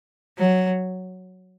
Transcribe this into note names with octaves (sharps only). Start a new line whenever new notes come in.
F#3